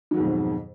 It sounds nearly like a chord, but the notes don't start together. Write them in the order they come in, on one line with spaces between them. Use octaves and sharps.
D#3 F#3 G#2 F2 B2